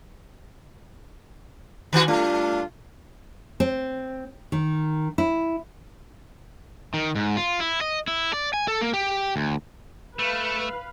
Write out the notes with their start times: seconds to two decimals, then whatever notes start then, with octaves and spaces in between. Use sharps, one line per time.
1.93 D#3 E3 F#4
2.08 G3 A3 D4 F4
3.60 C4
4.52 D#3
5.18 E4
6.94 D#3
7.15 G#2
7.37 F4
7.60 E4
7.81 D#5
8.08 E4
8.33 D5
8.54 G#5
8.68 A4
8.81 A#3
8.94 G4
9.36 D2
10.19 A3 B4 F5